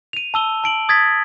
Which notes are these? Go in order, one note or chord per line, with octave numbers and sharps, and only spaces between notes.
D#7 F7
A5 E6 G7
A5 D7 F#7
D#6 G#6 A6 B6